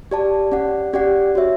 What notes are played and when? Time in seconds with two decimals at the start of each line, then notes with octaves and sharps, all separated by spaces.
0.11 G4 D5 A5
0.52 C#4 G4 D5 F#5
0.93 C#4 G4 D5 F#5
1.35 F#4 C#5 E5